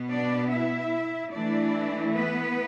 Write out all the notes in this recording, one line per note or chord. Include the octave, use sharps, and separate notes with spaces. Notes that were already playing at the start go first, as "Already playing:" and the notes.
Already playing: B2 B3
D4 D5
E4 E5
E3 A3 D4 E4 D5
B3 B4